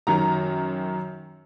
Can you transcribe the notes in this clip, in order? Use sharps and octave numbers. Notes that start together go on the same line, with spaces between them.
F#2 D#3 A#5